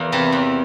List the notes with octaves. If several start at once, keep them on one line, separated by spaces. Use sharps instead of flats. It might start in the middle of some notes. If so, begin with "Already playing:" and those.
Already playing: E2 A#3
C3 E3
E2